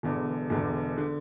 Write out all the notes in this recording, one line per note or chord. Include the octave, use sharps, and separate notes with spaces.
E1 E2 D3
E1 E2 D3
D3